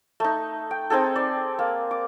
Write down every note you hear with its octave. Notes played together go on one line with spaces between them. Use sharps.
A3 D#4
G5
C4 D#4 G#4 A4
D5
A#3
D6